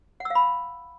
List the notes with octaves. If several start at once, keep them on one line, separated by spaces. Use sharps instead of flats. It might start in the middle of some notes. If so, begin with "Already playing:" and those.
F#5
E6
F5
B5